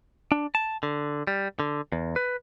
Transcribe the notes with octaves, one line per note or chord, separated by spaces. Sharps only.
D4
A5
D3
G3
D3
E2
B4